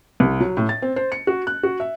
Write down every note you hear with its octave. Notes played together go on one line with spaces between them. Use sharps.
C2
F#3
A2
A6
C4
C5
C#7
F#4
F#6
F#4
E5